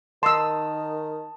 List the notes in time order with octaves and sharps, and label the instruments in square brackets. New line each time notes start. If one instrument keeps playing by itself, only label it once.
[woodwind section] D#3 [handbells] A5 D#6 [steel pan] C6 E6